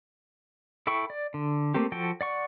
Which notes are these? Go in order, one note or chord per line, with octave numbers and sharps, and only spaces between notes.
E4 A4 G5 B5 C#6
D5
D3
A3 A#3 C4 G4
F3 F#4 A4 G5
D5 F#5 C#6